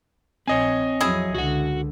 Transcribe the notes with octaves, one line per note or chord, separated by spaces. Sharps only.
A#1 C4 C#5 D#5 G#5
F2 F#3 E4 G#4
C#2 D3 F#4 F#5